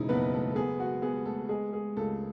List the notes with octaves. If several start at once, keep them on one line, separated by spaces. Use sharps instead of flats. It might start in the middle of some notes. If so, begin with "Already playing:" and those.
Already playing: E1 C#3 D#4 E4 D#5
F#1 B3 B4
A3 A4
A4
B3 G#4
F#4
B3 G#4
A3 A4
G#3 G#4
G#4
C#2 A3 A4